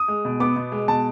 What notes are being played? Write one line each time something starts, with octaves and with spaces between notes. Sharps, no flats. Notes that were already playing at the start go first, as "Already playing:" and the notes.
Already playing: D#6
G#3
B2
B3 D6
B2
G#3
B2 A5